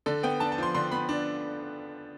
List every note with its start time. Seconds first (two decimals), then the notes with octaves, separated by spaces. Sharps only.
0.06 D3 A4
0.23 B3 G5
0.40 D4 A5
0.52 A5
0.58 F3 C6
0.75 D3 C6
0.91 B3 B5
1.09 D4